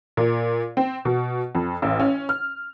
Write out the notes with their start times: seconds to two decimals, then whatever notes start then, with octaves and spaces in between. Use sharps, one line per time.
0.17 A#2
0.77 C4
1.05 B2
1.55 F2
1.82 A1
2.00 C#4
2.29 F6